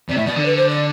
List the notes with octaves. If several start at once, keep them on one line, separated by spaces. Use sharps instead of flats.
C3 D5
A2 E5
B2 D5
D3
B4
C5
D5